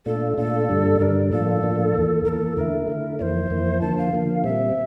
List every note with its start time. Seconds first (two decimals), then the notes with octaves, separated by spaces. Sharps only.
0.06 A#2 A3 D4 F4 A4
0.37 A#2 A3 D4 F4 A4
0.69 G2 D3 G3 D4
1.00 G2 D3 G3 D4 A#4
1.31 A2 F3 A#3 D4 F4 A4
1.63 A2 F3 A#3 D4 F4
1.94 E2 E3 A#3
2.25 E2 E3 A#3 A4 A#4
2.57 D3 A3 E4 A#4
2.88 D3 A3 E4
3.19 F2 E3 A#3 E4 C5 D5
3.50 F2 E3 A#3 E4
3.81 D3 F3 A#3 A5
3.98 F5
4.13 D3 F3 A#3
4.44 A#2 G3 C4 E5